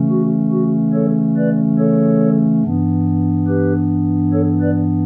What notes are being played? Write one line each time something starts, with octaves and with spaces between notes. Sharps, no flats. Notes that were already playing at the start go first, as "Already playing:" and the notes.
Already playing: C#3 E3 A3 C#4
F#4
F#4
A4 C#5
B4 D5
A4 C#5
G2 E3 B3 D4
G4 B4
A4 C#5
B4 D5